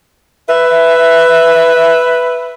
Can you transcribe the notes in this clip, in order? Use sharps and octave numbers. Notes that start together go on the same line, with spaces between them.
B4 E5